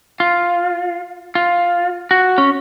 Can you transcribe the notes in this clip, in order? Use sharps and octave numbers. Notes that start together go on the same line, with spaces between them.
F4
F4
F#4
C#4